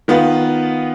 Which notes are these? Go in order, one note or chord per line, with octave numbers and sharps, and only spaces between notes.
D#3 B3 F4 B4